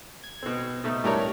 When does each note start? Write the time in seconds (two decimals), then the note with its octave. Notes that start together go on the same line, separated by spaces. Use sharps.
0.24 G#6
0.43 B2 C4
0.84 B2 A3 D#4
1.04 A2 G3 A3 D4 A#4 C#5